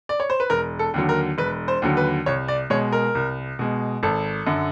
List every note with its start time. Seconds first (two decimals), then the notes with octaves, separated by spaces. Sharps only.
0.09 D5
0.20 C#5
0.30 C5
0.40 B4
0.50 E1 A#4
0.79 A4
0.94 D#2 D3 F#3
1.09 A#4
1.38 E1 B4
1.68 C5
1.82 D#2 D3 F#3
1.97 B4
2.26 C2 C#5
2.48 D5
2.70 B2 G#3 C#5
2.92 A#4
3.15 C2
3.59 B2 G#3
4.03 G#1 A4
4.47 F#2 D3